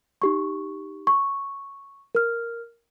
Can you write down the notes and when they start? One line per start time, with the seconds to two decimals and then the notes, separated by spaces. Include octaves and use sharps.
0.22 D#4 G4 C#6
1.07 C#6
2.15 A#4 F6